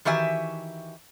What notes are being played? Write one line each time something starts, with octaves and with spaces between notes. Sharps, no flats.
D#3 E3 F#4 G4 E5 G#5